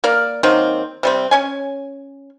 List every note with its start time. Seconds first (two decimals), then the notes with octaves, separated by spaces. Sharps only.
0.04 A#3 A#4 D5
0.43 D#3 F#3 A#3 C4
1.03 C3 G3 C4
1.31 C#4 C#5 G#5